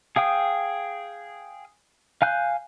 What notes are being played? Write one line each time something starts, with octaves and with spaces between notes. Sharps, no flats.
G#4 F5 G5 D#6
F5 G#5 F#6 G6